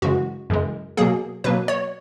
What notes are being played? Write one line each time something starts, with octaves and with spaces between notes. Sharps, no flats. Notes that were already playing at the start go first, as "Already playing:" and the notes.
F#2 C#3 E3 G#3 F#4
F#2 C#3 E3 G#3
B2 F#3 A#3 G#4
B2 F#3 A#3 B4
C#5